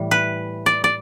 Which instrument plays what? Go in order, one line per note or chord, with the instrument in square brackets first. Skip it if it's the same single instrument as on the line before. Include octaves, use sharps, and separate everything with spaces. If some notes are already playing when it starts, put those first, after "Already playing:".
Already playing: [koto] A2 E3 G3
B4
D5
D5